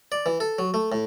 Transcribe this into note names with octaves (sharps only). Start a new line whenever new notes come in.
D5
E3
A4
F#3
A3
A2